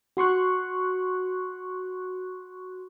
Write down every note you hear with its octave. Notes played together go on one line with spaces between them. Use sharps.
F#4 C6 C#6 F#6